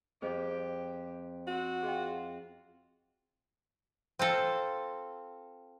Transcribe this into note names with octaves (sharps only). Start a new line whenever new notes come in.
F2 G4 G#4 C5 D#5
C4 F#4
F4 G#4 D#5 G5
C4 F4 A4